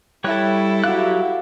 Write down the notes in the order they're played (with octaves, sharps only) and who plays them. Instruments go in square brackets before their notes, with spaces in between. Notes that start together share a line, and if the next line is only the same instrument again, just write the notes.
[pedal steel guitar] G3 C#5 F#6 [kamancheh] E4 A4
[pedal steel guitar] F#3 G4 F#6 [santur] F#4 F5